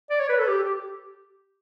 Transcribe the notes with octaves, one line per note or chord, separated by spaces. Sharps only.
D5
C#5
B4
A4
G4
G4